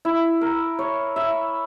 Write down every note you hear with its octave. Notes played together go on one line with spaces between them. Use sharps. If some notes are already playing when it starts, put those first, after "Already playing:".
E4
A#4
C#5
E5